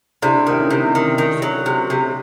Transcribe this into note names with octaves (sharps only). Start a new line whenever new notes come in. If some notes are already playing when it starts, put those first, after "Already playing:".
C3 D4 E4
D#3 E4
C#4 D#4
C3
D#3
D#3
F#3
C3
C3